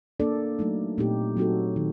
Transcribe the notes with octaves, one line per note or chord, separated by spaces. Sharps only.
A#3 D4 A4 D5
F#3 A3 D#4
A#2 A3 C4 D#4 G4
F#3 C4 D#4 F#4 A4
D#3 F#3